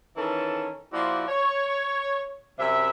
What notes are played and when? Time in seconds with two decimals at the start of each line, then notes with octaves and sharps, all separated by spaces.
0.17 D#3 E3 C#4 A4
0.92 F3 A#3 E4 F#4 C5 D5
1.28 C#5
2.59 F#2 C3 G3 E5